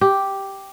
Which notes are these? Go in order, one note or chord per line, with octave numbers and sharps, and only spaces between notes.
G4